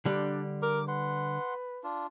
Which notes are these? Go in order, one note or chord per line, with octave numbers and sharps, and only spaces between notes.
D3 G3 D4
A#4 D6
B4 F#5 C6
D4 F4